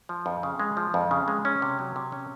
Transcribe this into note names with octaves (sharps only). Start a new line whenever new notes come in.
F3
F2
C#3
G#3
F3
F2
C#3
G#3
C#4
C3
F#3
C3
C#4